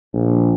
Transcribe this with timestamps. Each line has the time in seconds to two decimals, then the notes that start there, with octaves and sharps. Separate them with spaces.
0.14 A#1